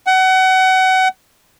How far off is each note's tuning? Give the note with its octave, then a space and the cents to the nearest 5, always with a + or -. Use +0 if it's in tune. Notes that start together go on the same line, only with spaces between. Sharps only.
F#5 +30